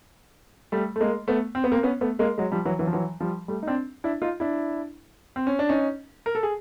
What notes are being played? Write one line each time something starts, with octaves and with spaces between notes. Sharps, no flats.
G3 A3
A3
G#3 A#3
A3 B3
C4
B3
A#3 C4
B3 C#4
A3 B3
G#3 A#3
F#3 G#3
F3 G3
E3 F#3
E3 F#3
F3
E3 F#3
F3 G3
G3 A3
D#4
C4 D4
D4 E4
D#4 F4
D4 E4
C4
C#4
D4
C#4 D#4
A#4
A4
G#4